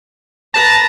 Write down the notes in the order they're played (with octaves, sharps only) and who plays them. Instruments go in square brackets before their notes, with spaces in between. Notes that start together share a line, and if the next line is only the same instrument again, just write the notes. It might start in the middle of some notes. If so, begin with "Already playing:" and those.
[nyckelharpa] B4 A#5 [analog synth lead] A5